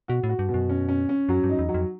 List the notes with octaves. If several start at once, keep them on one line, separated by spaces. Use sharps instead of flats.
B2 F#4
A2
F#4
G2
B2
F#2
C#4
C#4
C#4
F#2 F#3
G2
D#4
E2
F#3
F2